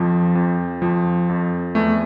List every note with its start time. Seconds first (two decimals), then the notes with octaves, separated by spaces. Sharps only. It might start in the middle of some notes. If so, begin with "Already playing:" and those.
Already playing: F2 F3
0.35 F2
0.82 F2 F3
1.29 F2
1.75 E2 A3